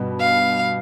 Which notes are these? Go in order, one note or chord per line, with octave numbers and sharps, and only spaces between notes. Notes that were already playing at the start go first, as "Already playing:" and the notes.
Already playing: G2 B2
F5